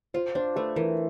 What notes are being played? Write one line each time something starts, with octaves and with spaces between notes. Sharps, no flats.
F4 C5
D4 C5
A3 B4
E3 A#4